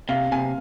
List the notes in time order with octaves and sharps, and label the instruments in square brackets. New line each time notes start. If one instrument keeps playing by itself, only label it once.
[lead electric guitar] C3 [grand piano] F5
[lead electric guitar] C3 [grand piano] G#5